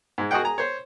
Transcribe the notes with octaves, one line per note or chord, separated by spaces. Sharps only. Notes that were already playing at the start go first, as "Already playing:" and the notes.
G#2 G#3
F#4 G#4 A#4 D#5 F#5 G5
G#4 A#5
C5 C#5